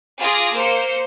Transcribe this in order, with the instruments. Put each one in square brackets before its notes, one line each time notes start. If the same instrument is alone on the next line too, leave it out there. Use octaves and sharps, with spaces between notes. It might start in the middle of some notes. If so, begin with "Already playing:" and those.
[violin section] F4 G#4 D6 A#6
A#3 C5 C#7